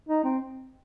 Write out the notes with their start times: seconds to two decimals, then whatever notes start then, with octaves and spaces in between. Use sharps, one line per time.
0.09 D#4
0.24 C4